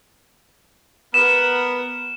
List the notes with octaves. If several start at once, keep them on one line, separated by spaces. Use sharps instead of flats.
B3 A#4 F#5 E7